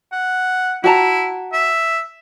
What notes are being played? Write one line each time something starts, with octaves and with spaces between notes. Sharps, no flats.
F#5
E4 F#4 A5 A#5
E5